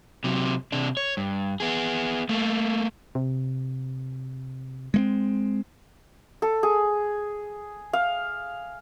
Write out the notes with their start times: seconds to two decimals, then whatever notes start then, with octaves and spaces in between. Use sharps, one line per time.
0.24 C3 F#3
0.72 C3 D4
0.97 C#5
1.17 G2
1.60 B3 G#4
2.29 A3 A#3
3.15 C3
4.94 G#3 A3 C4
6.42 A4
6.63 G#4
7.93 F5